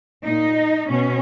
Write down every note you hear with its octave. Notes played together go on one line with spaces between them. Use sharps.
A#2 D#4
B2 C#4